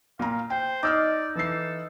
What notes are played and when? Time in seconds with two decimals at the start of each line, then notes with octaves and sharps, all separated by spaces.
0.19 A#2 F5 A#5
0.50 C5 G5
0.83 D#4 D5 D6 E6 F6
1.36 E3 A4 C7